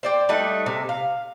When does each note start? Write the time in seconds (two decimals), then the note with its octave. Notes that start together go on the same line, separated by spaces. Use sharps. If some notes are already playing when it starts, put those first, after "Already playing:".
0.03 C5 D5 G5
0.29 G3 A3 D#4 F#5
0.66 C3
0.89 F5